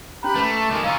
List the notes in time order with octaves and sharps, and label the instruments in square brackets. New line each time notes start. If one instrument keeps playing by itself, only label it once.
[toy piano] C#4 A#5 [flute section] G4 B5 F#6
[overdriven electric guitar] A3 [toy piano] B4
[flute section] A5 D6
[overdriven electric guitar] D#3 G#3
[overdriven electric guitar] C#4 F4 [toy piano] F5 A#5 E6